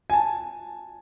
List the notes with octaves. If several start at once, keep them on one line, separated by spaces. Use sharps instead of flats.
G#5
A5